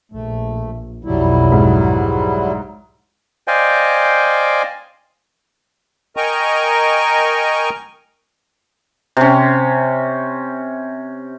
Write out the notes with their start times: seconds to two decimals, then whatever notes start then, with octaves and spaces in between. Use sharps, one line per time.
0.12 A#1 A3
1.05 B1 F2 F#3 G3 E4
1.52 G#2
3.48 C5 D5 D#5 F5 G5 G#5
6.17 A#4 D#5 G5 G#5 A#5 C#6
9.17 C3 C#4